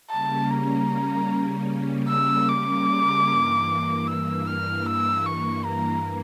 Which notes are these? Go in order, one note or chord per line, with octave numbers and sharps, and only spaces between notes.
C#3 G3 A#3 C#4 A5
A#5
E6
D6
G2 E3 A#3
E6
F6
E6
C#6
A#5